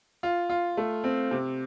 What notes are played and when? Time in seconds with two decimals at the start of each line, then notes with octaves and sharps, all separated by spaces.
0.23 F4
0.50 F4
0.77 A3
1.04 C4
1.31 C3